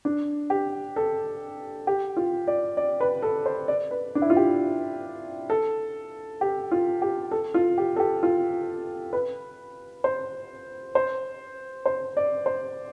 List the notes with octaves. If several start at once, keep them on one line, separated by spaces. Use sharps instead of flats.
D4
G4
A4
G4
F4
D5
D5
B4
A4
C5
D5
B4
D4
E4
F4
G4
A4
G4
F4
G4
A4
F4
G4
A4
G4
F4
B4
C5
C5
C5
D5
C5